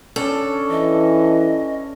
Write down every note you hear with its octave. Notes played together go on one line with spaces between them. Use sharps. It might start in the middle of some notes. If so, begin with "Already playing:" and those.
C#4 D4 A4 D5
E3 D#5